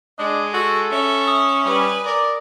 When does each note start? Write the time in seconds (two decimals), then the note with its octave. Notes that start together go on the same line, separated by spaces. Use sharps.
0.19 G#3 D4 D#5
0.54 F#4 A4
0.92 C#4 E5
1.28 D#6
1.65 G3 B4 G#5
2.06 A#4 D5